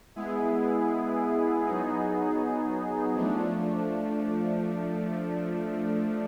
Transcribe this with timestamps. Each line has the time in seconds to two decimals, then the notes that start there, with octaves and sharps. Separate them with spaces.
0.16 G#3 B3 E4 G#4
1.65 F#3 B3 D#4 G#4
3.15 F3 A3 D4